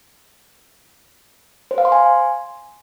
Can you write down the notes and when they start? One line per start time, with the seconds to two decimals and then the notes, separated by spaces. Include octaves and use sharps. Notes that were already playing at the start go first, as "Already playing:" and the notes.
1.71 C5
1.78 F5
1.85 C6
1.92 G#5